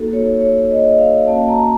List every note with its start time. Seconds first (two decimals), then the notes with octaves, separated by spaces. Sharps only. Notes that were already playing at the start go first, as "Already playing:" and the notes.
Already playing: A#3 D#4 F#4 A4
0.13 C#5
0.42 C#5
0.71 D#5
0.78 C#5
0.87 D#5
0.98 F5
1.27 A#3 C#4 F#4 A5
1.48 A#5